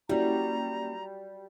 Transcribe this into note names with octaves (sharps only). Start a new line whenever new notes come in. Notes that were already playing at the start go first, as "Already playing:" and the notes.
G3 A#3 C#4 E4 F#4 G4 A#5